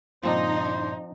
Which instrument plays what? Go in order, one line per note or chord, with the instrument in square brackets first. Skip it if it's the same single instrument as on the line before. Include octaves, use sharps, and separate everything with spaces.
[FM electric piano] G2 A#2 C#3 [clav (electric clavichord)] F3 C4 D4 [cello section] D#4 [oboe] C5